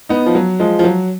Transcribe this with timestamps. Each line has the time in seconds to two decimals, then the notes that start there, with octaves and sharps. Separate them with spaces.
0.09 B3 D#4
0.26 F3
0.35 F#3
0.60 F3 G#3
0.79 F3
0.84 F#3